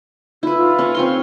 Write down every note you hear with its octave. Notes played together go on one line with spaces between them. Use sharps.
E4 F4 B4
F4
C#4
C4 C#5 C6